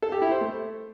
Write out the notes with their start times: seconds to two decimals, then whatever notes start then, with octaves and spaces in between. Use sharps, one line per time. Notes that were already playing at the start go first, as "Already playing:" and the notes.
0.02 A4
0.12 G4
0.22 E4
0.31 C5
0.41 A3